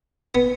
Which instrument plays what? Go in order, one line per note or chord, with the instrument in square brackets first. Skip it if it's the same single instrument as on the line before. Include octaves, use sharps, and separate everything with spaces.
[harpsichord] B3